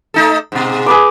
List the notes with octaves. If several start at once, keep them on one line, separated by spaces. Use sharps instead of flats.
A3 D#4 A4
G#2 B2
G#4 B4 D6